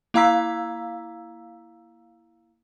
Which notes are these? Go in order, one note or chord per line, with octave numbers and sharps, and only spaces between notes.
A#3 E4 F5 A#5 E6 B6